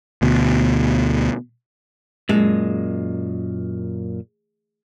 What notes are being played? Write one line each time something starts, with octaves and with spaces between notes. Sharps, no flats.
D2 B2
F#2 A#2 G#3